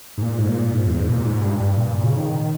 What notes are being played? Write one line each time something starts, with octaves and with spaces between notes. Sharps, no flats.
G#2
A#2
G#2
A#2
G#2
E2
G#2
B2
A#2
G#2
G2
G2
A#2
A#2
C#3
D#3